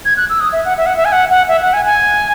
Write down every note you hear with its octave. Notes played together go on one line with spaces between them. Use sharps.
G#6
F#6
E6
D#6
E5
F#5
E5
F#5
E5
G#5
F#5
F#5
E5
F#5
G#5
G#5